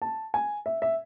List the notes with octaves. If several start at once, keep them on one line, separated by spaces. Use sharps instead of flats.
A5
G#5
E5
E5